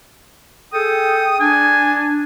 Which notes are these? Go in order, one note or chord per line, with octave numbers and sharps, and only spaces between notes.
G#4 A4 G5 D#6
D4 G#5